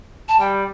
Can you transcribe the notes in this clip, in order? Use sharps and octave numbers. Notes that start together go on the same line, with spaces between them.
A5
G3 G5